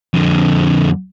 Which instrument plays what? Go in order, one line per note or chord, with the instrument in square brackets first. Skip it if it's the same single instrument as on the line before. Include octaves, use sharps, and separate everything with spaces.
[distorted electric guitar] F2 D3